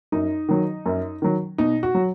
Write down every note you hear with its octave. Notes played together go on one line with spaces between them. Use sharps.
F#2 D#4
D#3 F#3
F#2
D#3 F#3
B2 D#4
F#4
F#3